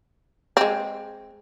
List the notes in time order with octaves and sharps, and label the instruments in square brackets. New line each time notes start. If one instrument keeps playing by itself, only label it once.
[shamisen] G#3 C4